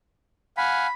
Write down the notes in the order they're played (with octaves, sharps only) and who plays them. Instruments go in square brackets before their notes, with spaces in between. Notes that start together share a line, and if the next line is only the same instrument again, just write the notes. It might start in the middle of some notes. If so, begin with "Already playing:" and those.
[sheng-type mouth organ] F5 F#5 G#5 [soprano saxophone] B5